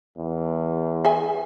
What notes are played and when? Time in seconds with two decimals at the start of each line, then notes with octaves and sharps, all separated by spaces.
0.17 E2
1.05 G#4 E5 G#5